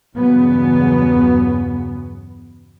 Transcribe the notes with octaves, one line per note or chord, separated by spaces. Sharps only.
E2 G2 C#3 F#3 B3